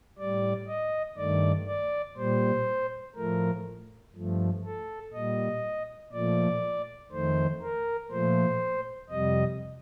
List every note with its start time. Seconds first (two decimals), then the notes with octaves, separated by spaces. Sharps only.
0.19 A2 G3 D5
0.68 D#5
1.17 G2 D#3 A3 D5
1.67 D5
2.17 A#2 G3 C5
3.16 A2 F3 A3 A#4
4.15 G2 F3 A3
4.65 A4
5.14 A#2 G3 D#5
6.13 A#2 F3 A3 D5
7.12 F2 D#3 A3 C5
7.61 A#4
8.11 A#2 F3 A3 C5
9.10 F2 C3 G3 D#5